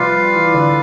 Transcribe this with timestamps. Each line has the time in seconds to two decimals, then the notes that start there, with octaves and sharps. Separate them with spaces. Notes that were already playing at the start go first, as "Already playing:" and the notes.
Already playing: C3 F3 G3 F4 B4 D5 F5
0.35 E3
0.54 D3